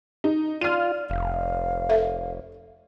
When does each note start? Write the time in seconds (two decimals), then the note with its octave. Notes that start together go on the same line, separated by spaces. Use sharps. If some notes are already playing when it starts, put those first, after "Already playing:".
0.24 D#4
0.61 F4 D5 F6 D#7
1.10 F1 F5
1.89 A4 E5